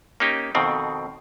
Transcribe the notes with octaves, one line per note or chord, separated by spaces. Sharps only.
A#3 C#4 D#4 G4
F2 B2 D#3 C4